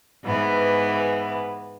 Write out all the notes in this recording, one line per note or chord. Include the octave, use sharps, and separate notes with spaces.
G#2 E3 B3